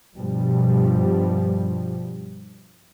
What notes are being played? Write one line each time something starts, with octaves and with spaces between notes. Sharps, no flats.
G2 B2 F3 G3